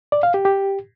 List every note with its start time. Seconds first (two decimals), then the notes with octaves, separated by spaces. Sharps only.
0.12 D5
0.23 F5
0.34 G4
0.45 G4